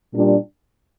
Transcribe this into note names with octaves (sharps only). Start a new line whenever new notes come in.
A#2 G3 D4